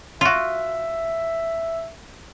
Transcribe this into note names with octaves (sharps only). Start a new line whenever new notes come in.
F4 F#4 E5